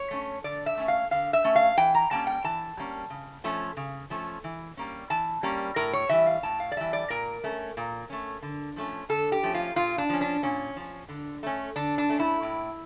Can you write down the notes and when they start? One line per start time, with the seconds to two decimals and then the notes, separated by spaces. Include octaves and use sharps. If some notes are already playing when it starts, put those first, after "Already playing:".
Already playing: C#5
0.11 A3 C#4
0.44 D3 D5
0.66 E5
0.77 A3 C#4
0.88 F5
1.11 D3 F5
1.33 E5
1.44 A3 C#4
1.56 F5
1.77 E3 G5
1.94 A#5
2.11 G3 A#3 C#4 A5
2.27 G5
2.44 E3 A5
2.77 G3 A#3 C#4
3.10 C#3
3.44 F3 A3 C#4
3.77 C#3
4.10 F3 A3 C#4
4.44 E3
4.77 G3 A#3 C#4
5.10 E3 A5
5.43 G3 A#3 C#4
5.76 A2 A#4
5.93 C#5
6.09 E3 G3 E5
6.27 F5
6.43 A2 A5
6.60 F5
6.72 D5
6.77 E3 G3 E5
6.93 D5
7.10 A#2 A#4
7.44 A3 C#4
7.77 A#2
8.10 A3 C#4
8.42 D3
8.76 F3 A3 C#4
9.09 D3 A4
9.32 G4
9.43 F3 A3 C#4
9.54 F4
9.76 A#2 F4
9.98 D4
10.09 F3 C#4
10.21 D4
10.43 A#2 C#4
10.76 F3 C#4
11.09 D3
11.43 A3 C#4
11.76 D3 D4
11.98 D4
12.09 A3 C#4
12.19 E4
12.42 A2